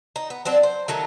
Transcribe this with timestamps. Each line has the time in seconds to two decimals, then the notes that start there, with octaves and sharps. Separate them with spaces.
0.16 D#4
0.30 B3
0.45 F#3 C4 D4
0.63 C5
0.88 D#3 F#3 A3 A4